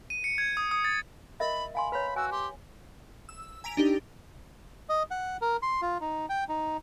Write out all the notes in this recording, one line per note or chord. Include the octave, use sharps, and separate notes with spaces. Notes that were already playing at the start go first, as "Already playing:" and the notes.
D#7
C#7
G#6
D#6
D#6
A6
A#4 D#5 E5 B5
F5 G#5 B5 C6
B4 C#5 A#5 B5
F#4 G#5 E6
G4 C6
E6
G#5 A#5 B6 D7 F7
D4 D#4 G4
D#5
F#5
A#4
C6
F4
D#4
G5
D#4